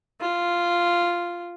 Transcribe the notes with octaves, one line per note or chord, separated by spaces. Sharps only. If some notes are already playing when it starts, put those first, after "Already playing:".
F4